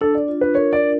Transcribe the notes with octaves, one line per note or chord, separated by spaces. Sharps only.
D4 A4
D5
F4
B4
A#4 C#5
D5
D4